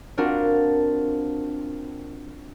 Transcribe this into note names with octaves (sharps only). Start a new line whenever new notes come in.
C4 D4 F4 F#4 A#4